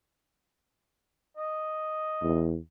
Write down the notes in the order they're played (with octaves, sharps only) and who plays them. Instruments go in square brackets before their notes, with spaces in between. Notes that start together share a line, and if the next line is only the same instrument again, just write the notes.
[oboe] D#5
[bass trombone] E2